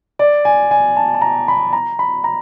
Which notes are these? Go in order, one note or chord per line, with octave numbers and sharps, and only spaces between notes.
D5
G#5
G#5
A5
A5
A#5
B5
A#5
B5
A#5